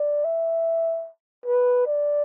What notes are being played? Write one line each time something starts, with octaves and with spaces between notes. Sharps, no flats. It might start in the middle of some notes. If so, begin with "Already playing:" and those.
Already playing: D5
E5
B4
D5